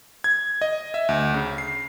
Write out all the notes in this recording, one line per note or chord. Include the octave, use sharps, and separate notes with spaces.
G#6
D#5
E5
D2
C#3
C7